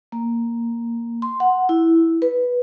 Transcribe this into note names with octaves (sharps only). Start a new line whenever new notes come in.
A#3
C6
F#5
E4
B4